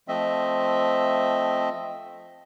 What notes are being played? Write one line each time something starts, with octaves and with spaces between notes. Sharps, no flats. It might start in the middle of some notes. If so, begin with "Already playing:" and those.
F3 A3 C4 D#5 E5